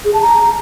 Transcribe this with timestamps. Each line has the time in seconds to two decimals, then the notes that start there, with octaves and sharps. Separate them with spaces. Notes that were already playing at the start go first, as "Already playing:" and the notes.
0.05 G#4
0.13 A5
0.22 A#5